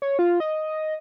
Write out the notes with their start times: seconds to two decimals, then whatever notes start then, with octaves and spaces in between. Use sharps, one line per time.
0.02 C#5
0.19 F4
0.40 D#5